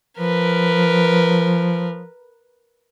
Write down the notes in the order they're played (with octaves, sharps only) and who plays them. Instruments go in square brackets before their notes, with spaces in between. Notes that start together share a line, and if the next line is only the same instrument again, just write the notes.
[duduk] F3 [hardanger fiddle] A#4 B4